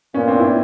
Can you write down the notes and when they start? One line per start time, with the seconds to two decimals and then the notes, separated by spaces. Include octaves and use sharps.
0.14 A#2 B3 C#4
0.28 C4 D4
0.39 D4 E4